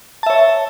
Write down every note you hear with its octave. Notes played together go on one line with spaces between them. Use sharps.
C#5 E5 A5